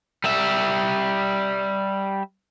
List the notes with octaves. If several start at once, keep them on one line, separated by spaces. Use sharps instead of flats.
G3 E5